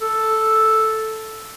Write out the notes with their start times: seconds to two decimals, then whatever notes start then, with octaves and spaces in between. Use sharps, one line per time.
0.01 A4